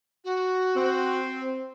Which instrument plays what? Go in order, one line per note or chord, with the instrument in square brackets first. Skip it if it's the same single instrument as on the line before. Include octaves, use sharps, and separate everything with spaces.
[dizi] F#4
[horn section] C4